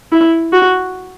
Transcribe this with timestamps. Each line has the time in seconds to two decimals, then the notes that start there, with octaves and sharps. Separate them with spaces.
0.12 E4
0.53 F#4